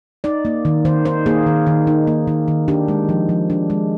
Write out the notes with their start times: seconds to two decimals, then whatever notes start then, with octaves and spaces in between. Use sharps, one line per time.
0.24 D#4 D5
0.45 A#3
0.65 D#3
0.85 D#3 C5
1.05 D#4 C5
1.26 A#3 G#4
1.46 D#3
1.67 D#3
1.87 D#4
2.07 A#3
2.27 D#3
2.48 D#3
2.68 D4 G4
2.88 G#3
3.09 F3
3.29 F3
3.50 D4
3.70 G#3